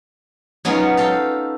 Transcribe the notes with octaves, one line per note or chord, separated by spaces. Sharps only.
F#3 G#3 B3 C#4 D#4 F4
A4 F5 G5